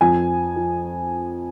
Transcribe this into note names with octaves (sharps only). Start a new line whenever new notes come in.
F2 F3 G#5
F3